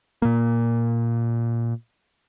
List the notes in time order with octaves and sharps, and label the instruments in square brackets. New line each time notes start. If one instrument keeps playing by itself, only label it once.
[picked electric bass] A#2 A#3